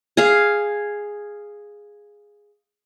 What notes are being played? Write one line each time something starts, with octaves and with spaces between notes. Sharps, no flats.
G#4 F5